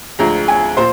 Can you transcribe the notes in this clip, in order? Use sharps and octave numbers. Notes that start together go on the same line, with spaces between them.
D2 D3 F3 G#3 A#5
G#5
A#2 C5